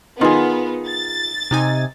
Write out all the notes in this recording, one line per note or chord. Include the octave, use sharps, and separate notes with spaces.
D#3 B3 F4 G#4
A6
C3 D#4 G#5